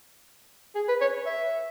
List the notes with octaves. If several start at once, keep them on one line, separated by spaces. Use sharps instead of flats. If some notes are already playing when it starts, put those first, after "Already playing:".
G#4
B4
C#5
E5